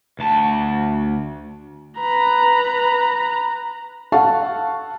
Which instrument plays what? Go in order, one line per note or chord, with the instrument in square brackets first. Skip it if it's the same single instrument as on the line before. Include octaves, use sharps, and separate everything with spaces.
[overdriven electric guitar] D2 A5
[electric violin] B4 A#5
[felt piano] A4 F5 F#5 A5 C#6